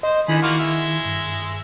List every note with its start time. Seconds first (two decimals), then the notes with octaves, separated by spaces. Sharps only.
0.03 C5 D#5
0.28 D3 D#3 E4 G#4 B5
0.42 A#3 F4 F#4
0.59 G#3 E5
1.05 G2